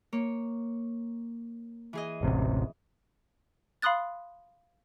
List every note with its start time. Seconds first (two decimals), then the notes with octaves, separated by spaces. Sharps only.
0.13 A#3 C#5
1.93 E3 G#4 D#5
2.21 E1 A1 C3
3.82 F5 B5 C6 D#6 F#6 A6